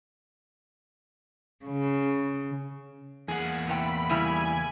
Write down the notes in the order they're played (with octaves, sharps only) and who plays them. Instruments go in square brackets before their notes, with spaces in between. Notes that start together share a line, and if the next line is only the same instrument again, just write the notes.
[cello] C#3
[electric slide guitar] E2 A#3 F#5 [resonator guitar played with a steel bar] G#4
[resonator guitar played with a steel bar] A2 C3 G5 [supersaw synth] B5
[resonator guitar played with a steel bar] C#3 G3 E4 [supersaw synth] G#5